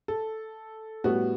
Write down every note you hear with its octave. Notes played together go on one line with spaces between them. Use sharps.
A4
A2 G3 B3 F#4